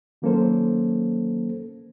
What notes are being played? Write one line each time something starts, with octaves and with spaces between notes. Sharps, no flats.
D#3 F#3 A#3 C#4 A4 C5